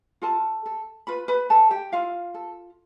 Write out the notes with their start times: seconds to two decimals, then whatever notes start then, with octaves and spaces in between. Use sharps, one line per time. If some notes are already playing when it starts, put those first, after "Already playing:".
0.22 F4 A4 A5
0.66 A4
1.07 F4 B4 B5
1.28 B4 B5
1.49 A4 B4 A5
1.71 G4 G5
1.92 E4 F4 F5
2.34 A4